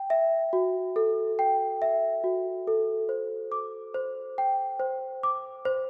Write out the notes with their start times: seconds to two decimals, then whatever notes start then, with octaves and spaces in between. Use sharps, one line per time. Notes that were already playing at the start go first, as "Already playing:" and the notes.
Already playing: G5
0.10 E5
0.53 F#4
0.96 A4
1.39 G5
1.82 E5
2.24 F#4
2.67 A4
3.09 C5
3.52 D6
3.94 C5
4.38 G5
4.80 C5
5.23 D6
5.65 C5